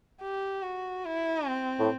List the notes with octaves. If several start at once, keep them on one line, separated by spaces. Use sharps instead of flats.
G4
F#4
E4
C4
A2